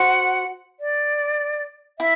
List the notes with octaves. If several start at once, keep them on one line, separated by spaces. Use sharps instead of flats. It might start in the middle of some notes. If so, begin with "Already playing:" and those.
Already playing: F#4 C5 F#5
D5
E4 E5